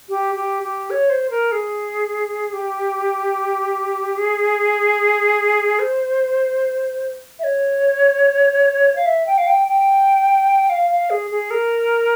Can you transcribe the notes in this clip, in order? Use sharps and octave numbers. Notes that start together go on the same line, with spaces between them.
G4
G4
G4
C#5
C5
A#4
G#4
G4
G#4
C5
E5
C#5
F5
E5
G5
F5
G5
G5
F5
F5
G#4
G#4
A#4